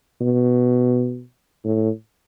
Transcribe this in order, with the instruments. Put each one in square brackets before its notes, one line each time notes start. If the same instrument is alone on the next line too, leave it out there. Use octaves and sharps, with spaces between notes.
[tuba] B2
A2